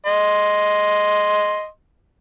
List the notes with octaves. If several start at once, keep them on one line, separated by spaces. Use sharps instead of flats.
D#5 C6